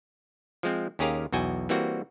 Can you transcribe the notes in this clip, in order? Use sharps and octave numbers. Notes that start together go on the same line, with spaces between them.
F3 G#3 C4
D#2 C#4 G4 G#4 A#4 F5
B1 E2 F#4 G5 G#5
E3 G3 A#3 C4 F#4